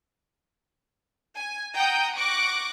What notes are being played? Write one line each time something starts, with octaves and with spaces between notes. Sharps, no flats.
G#5
F#5 G5 A#5 D#6 G6
C#6 D6 F#6 A#6 D7